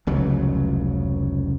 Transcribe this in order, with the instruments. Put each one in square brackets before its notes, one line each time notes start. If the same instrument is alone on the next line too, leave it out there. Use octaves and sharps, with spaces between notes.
[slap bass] F1 C#2 C#3 F#3